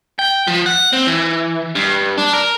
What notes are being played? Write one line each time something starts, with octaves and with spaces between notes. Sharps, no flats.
G5
F3
F#5
C4
E3
G2
D4
A#4